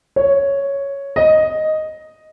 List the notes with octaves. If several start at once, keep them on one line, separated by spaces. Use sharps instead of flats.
C#5
D#5